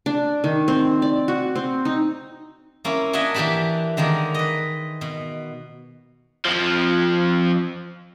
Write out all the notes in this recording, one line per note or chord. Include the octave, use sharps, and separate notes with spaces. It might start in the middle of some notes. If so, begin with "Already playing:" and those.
D4
D#3
C4
D5
F#4
C4
D#4
A#3 C#4 E4
A#3 D4 D#5 E5 F#5 G#5
E3 A#3 D4 G4 A5 B5
D3 D#3 G#3 A#3
B4 D#5
B2
F2 F3